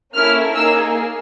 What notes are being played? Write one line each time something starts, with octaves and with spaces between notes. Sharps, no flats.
A#3 C#4 E4 A4 F6
A#3 D#4 G#4 E6